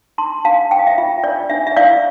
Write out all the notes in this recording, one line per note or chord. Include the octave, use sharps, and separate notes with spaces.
D4 A5 C6
D4 F5 A5
C5 G5
F5
E5 G5
F4 E5
D4 D5
D4 E5
E5
E4 D5 F5